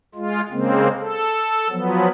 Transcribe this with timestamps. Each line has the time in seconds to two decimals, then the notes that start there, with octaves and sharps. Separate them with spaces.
0.15 G#3 F4
0.51 C#3 G#3 A#3 C4
0.99 A4
1.70 F3 F#3 B3